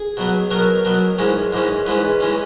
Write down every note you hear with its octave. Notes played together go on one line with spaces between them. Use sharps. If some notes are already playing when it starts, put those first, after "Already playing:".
Already playing: G#4
B2 F#3 B3
B2 F#3 B3 A#4
B2 F#3 B3
G#2 E3 G#3 C#4
G#2 E3 G#3 C#4
G#2 E3 G#3 C#4 B4
E3 G#3 C#4